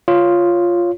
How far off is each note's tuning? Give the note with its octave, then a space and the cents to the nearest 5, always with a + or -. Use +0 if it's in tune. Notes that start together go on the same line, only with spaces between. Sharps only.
F4 +0 C#5 +0